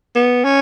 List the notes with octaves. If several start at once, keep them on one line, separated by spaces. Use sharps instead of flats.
B3
C#4